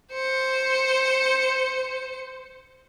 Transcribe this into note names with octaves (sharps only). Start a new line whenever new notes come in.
C5 C#7